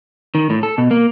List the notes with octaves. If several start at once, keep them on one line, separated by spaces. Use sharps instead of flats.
D#3
A2
A4
B2
A#3